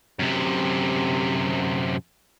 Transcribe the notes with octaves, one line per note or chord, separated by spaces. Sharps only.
F#2 C3